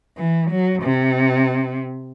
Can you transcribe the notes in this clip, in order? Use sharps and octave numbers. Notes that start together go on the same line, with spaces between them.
E3
F#3
C3